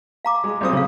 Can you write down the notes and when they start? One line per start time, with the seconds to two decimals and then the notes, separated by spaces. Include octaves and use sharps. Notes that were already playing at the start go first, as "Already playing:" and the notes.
0.25 F5 A#5 D6
0.44 G#3
0.61 B1 C4 D#6
0.73 C#3 C#5 F5